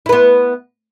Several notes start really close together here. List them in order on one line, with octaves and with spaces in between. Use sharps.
E4 B4 B3